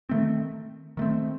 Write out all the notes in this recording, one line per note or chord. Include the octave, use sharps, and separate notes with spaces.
D#3 A3 C4
D#3 A3 C4